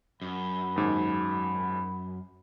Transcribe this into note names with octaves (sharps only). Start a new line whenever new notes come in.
F#2 B5
D#2 G#2